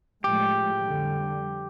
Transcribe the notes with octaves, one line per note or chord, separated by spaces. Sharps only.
A2 F3 G#3 G4
F2 D3 G3